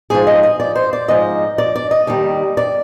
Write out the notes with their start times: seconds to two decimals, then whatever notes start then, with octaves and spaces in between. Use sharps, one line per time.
0.10 G#2 F3 G#4
0.27 D#5
0.43 D#5
0.60 D5
0.75 C5
0.93 D5
1.08 G#2 F3 D#5
1.58 D5
1.76 D5
1.91 D#5
2.07 D#2 D#3 G3
2.57 D5